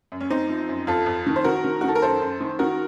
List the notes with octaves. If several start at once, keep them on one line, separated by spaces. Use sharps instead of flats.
F#2
C#4
F#2 C4 D#4
F3
F#2
F2 F4 A4
F2
D#3
C5
D#3 F#4 A#4
D#3
F#4
D#3 A4
A#4
F#2 A4 C5
F#2
D#3
D#3 F#4 A#4